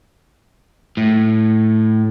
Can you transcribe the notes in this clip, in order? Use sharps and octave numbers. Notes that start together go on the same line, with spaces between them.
A2